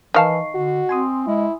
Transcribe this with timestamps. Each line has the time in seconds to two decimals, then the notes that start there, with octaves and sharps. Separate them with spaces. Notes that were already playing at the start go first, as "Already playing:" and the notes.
0.14 D#3 E3 D#5 F5 A5 C#6 C7
0.55 D3 F#4
0.89 C4 G#5 C6 D#6
1.27 G#3 E4